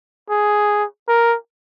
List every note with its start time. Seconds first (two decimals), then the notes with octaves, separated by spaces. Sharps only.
0.30 G#4
1.08 A#4